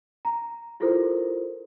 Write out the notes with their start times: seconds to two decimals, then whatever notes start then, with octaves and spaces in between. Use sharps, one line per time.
0.25 A#5
0.80 E4 F4 G4 A4 A#4 C5